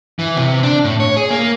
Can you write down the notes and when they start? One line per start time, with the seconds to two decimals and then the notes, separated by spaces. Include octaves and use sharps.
0.19 E3
0.37 C3
0.63 D4
0.84 A2
1.00 C#5
1.17 G#4
1.30 A#3